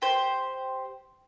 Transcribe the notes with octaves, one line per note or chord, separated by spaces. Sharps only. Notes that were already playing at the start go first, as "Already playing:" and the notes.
G4 C5